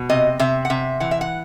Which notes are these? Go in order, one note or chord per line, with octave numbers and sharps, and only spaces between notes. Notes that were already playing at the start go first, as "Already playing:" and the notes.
Already playing: B2
C3 D#5
C3 E5
F#5
C3 E5
E3 F#5
E5
F#5